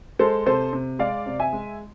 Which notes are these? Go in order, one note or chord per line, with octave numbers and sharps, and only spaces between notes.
G#3 A4 C5
C3 A4 C5
C3
G#3 D5 F5
C3
E5 G#5
G#3